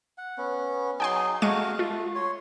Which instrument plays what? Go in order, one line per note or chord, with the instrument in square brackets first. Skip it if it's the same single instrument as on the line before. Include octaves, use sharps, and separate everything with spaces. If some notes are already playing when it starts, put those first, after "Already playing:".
[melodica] F#5
B3 C#4
[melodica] F#3 D#4 G#4 [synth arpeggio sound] G5 G#5 C6
[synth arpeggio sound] G#3 C#6 D#7 [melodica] A3 F#4 F5
[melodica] A3 [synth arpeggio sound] F4
[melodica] C#5 C6